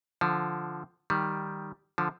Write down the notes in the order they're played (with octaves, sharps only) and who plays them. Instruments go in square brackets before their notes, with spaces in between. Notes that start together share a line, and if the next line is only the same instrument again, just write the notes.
[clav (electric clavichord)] D3 F3
D#3 G3
D3 F3